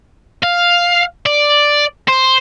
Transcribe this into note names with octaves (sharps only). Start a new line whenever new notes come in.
F5
D5
C5